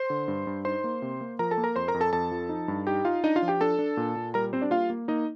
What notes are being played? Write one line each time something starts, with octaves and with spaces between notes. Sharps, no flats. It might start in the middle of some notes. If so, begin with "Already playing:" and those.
Already playing: C5 C6
D3
G2
G2
D#4 C5 C6
A#3
C3
A#3
F3 A#4 A#5
A4 A5
A#3
A#4 A#5
F2 C5 C6
A#4 A#5
F2
A4 A5
F2 A4 A5
F3
D#4
G2
D#4 G4 G5
D#4 F4 F5
D4 D#4 D#5
F4 F5
F3
G4 G5
D4 A4 A5
D4
A#2
A#2
G3 A#4 A#5
G3 C4 C5
D4 D5
A#3 F4 F5
A#3
A#3 D#4 D#5